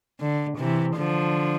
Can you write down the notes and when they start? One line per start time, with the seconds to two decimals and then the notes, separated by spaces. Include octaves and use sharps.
0.20 D3
0.58 C3 E3
0.97 D3 F3